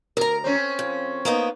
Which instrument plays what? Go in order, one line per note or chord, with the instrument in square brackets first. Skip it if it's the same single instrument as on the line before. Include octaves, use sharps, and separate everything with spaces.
[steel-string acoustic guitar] D2 A#5 [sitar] A#4
[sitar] C4 C#4
[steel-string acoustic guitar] F2
A#3 B3 D#4